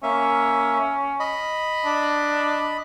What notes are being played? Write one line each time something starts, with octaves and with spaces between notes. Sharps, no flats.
A#3 C#4 E5
D#5 B5
D4